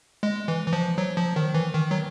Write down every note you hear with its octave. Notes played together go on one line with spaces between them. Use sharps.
G#3
E3
E3
F3
F#3
F3
D#3
E3
D#3
F#3